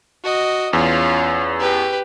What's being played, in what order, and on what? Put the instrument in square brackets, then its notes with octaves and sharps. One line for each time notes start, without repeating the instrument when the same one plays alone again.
[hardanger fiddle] F#4 D#5
[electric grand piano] E2 [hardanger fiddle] C#4 F4
[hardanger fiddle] G4 B4